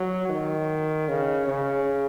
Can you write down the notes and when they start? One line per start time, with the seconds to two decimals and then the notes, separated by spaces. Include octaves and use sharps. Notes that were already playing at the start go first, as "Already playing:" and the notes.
Already playing: F#3
0.29 D#3
1.08 C#3
1.47 C#3